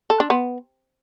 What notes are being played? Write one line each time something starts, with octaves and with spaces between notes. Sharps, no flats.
A4
D4
B3